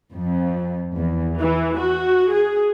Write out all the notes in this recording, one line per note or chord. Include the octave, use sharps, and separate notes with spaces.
F2
E2
E3
F#4
G#4